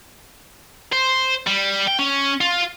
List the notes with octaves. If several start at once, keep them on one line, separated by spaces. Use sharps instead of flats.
C5
G3
G5
C#4
F4